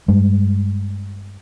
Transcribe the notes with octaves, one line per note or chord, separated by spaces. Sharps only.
G2 G3 G#3